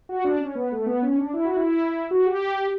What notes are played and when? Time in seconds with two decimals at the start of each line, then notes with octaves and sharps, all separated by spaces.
0.09 F#4
0.24 D4
0.40 C#4
0.55 B3
0.72 A3
0.86 B3
1.02 C#4
1.18 D4
1.33 E4
1.45 F#4
1.56 E4
2.11 F#4
2.26 G4